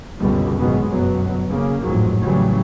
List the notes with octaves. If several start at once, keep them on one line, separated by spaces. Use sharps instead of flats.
C#2 F#2 B2 D3 G3
G#1 B2 D#3 F#3 G#3 B3
G1 F#2 B2 F#3 B3
C#3 A#3
A1 F2 G#2 F#3
A2 C#3 E3 F#3 G3